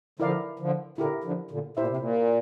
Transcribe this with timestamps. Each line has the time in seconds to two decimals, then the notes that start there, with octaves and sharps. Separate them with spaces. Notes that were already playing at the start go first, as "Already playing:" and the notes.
0.19 D3 F3 E4 A#4 D5 F5
0.59 D3 F3
0.98 A#2 D3 E4 G4 A#4
1.24 D3 F3
1.51 A#2 D3
1.77 A#2 E4 G4 C5 E5
1.87 C3
1.97 A#2